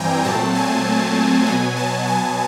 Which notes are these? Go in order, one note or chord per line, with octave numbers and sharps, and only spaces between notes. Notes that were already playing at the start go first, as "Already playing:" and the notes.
Already playing: G2 E3 G3 C4 G5 G#5 A#5
A#2 F#3 A3 C4 A5
G#5
B2 F#3 B3 G#5
A5
G#5